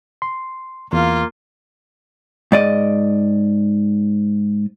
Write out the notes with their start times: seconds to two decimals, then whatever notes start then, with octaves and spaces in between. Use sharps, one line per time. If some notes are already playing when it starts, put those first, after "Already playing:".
0.22 C6
0.93 E2 A#3 F4
2.52 G#2 D5 D#5